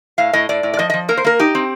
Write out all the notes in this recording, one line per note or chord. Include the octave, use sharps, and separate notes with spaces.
A2 F5
A2 D#5
A2 D5
A2
D5
F3 D#5
F3 D#5
A#3 A#4
C5
A#3 A#4
D#4 G4
C4